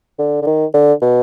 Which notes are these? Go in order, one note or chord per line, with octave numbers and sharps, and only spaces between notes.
D3
D3
D#3
D3
B2